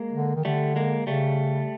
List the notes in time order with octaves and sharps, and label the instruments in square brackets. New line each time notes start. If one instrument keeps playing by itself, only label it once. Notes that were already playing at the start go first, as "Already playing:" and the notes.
Already playing: [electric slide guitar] G#3 A#3
[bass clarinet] D3
D#3
[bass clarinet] D3 [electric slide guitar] G3 A3
[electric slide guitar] G#3 A#3
[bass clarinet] C#3 [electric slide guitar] G3 A3